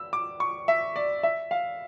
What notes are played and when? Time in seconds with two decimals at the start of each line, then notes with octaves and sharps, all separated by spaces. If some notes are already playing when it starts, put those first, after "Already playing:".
Already playing: E6
0.13 D6
0.40 C#6
0.68 E5
0.96 D5
1.23 E5
1.51 F5